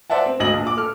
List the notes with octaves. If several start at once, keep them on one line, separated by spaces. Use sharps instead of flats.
C5 D5 E5 F#5 A5
C4
G#1 D2 D#5 F#7
A#1
A#2 D6
A4 F6